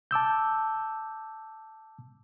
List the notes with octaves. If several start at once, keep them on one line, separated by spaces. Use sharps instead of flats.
A5 D6 E6 G6